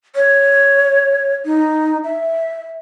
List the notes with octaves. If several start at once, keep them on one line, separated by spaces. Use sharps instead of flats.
C#5
D#4
E5